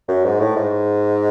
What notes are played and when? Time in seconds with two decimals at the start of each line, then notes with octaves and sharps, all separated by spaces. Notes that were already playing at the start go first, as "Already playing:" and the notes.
0.08 F#2
0.24 G#2
0.40 A2
0.56 G#2